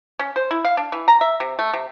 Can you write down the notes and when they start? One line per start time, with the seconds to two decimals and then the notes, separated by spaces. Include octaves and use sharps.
0.19 C#4
0.36 C5
0.51 E4
0.65 F5
0.77 D4
0.92 E3
1.08 A#5
1.21 E5
1.40 C3
1.59 A3
1.73 C3